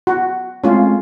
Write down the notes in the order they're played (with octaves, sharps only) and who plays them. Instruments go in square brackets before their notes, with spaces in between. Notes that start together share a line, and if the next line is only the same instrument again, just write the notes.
[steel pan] F#4
[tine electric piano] G#3 A3 C4 [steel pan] C#4 F4